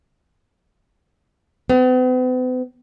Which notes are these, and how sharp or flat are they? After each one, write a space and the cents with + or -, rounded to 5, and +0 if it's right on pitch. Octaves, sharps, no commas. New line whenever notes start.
B3 +45